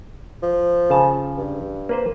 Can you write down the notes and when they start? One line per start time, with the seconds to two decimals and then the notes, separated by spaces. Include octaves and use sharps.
0.43 F3
0.90 C#3 A5
1.38 G2
1.89 A#3 B4 C5